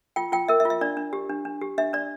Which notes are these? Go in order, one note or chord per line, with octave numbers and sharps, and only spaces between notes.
F4 G5
F4 G5
A#4 E5
E5
F4
E5
D4 D5
D4
G4
D4
D4
G4
D4 E5
D4 D5